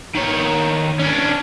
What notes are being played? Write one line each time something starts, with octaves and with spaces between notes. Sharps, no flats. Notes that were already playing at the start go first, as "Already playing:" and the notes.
D#3 C#5
C#4 D4